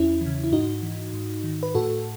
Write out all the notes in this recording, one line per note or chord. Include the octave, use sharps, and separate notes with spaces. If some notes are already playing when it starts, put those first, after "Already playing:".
Already playing: E2 C#4 E4
E3
C#3
E4
G#2 D#4 F#4
E3
G#2
D#3
B4
A2 F#4 A4